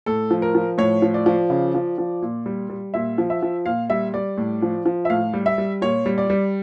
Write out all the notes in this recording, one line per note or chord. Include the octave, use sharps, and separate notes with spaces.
A2 A4
F3
A#4
F3
A2 C#5
F3
D5
F3
C#3
F3
F3
A#2
G3
G3
A#2 E5
F3
E5
F3
A#2 F5
G3 E5
G3 D5
A2
F3
F3
E5
A2 F5
G3
E5
G3
A#2 C#5
G3
D5
G3